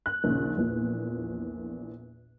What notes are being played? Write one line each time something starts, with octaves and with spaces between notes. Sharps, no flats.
F#6
A#1 D#2 C#3
A#1 E2 A#2